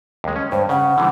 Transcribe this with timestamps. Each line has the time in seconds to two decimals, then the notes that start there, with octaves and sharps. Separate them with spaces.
0.24 D#2 G#3
0.36 C#4
0.52 G2 C5
0.69 C#3 F#5
0.98 D3 E3 G3